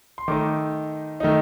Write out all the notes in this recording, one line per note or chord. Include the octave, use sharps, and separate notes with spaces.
C6
D#3 A3 D#4 D6
D#3 A3 D#4